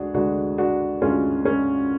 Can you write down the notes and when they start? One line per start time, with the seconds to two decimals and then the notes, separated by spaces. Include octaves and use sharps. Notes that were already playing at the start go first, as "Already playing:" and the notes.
Already playing: D2 G#3 D4 F#4 G#4
0.14 D2 D3 G#3 D4 F#4
0.58 D4 F#4
1.01 D2 D3 G#3 C#4 F4
1.45 C#4